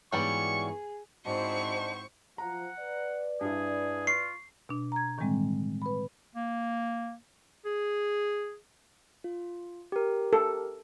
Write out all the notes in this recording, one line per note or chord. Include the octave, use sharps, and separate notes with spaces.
G#2 E3 F#3 G3 B3 G#4 D5 C#6
G#2 G#3 C4 D4 E4 F#4 C5 C#6
F3 F#5 A#5
B4 D5
G2 E4 G#4
F4 C#6 C7
B2 D4
A#5 G#6
A2 D#3 E3 G3 G#3 C4
B4 B5
A#3
G#4
F4
G4 A#4
A4